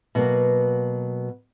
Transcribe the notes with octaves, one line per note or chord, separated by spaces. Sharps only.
B2 F#3 A#3